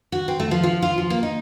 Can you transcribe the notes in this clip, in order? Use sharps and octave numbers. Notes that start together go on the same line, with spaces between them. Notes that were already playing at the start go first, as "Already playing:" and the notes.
F#4
C4
A3
F3
F3
F4
F3
A#3
D#4